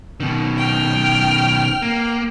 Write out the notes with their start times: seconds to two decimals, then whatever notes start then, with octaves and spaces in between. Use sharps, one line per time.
0.20 B2 D#3
0.57 G5 F6
1.82 A#3